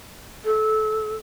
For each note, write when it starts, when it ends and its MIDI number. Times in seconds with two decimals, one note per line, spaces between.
0.45 1.15 69